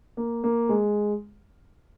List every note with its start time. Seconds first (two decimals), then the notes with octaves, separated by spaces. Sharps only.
0.17 A#3
0.44 A#3
0.69 G#3